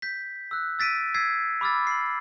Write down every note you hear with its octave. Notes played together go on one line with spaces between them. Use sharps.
G6 B6
E6 F#6
E6 A6 B6 D7 D#7
E6 G#6 A6 B6 C7
B5 D6 E6 F6 A6
C7 F#7